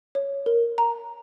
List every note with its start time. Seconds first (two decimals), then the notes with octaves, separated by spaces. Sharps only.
0.15 C#5
0.46 A#4
0.78 A#5